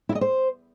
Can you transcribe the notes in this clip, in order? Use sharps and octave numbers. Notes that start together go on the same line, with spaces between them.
E4
D#5
C5